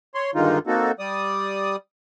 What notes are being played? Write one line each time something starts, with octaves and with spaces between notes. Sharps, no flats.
C#5 C6
G2 D3 D#3 G#3 D#4 F4
A#3 C4 D#4 F#4 A4
G3 D5 D#6